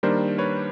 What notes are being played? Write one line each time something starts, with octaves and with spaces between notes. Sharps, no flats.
D#3 G3 A#3 D4 A#4 C5
B4 C#5